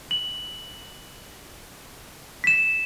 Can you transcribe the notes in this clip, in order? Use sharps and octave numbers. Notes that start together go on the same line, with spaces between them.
F#7
B6 E7